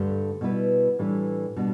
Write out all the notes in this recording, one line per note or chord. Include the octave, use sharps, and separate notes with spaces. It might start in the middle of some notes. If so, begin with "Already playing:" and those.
Already playing: G2 D3 A3 G4
B2 G3 E4 B4
A2 E3 G3 D4 B4
B2 G3 D4